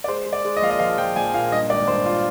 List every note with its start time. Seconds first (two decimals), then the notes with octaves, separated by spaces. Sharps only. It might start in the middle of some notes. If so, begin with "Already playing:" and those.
0.04 D5
0.08 G#3 C5
0.26 G#3
0.33 D5
0.45 G#3
0.57 D#5
0.62 A#1 F5
0.70 D#5
0.80 F3 F5
0.98 F3 G5
1.16 A#1 G#5
1.34 A#2 F5
1.52 G2 D#5
1.70 G#1 D5
1.88 G2 C5
2.06 F4